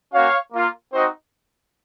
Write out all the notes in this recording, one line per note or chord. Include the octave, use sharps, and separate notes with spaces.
A#3 C#4 F#4 C#5 F5
A#3 F4
C4 D#4 F#4 C5 D#5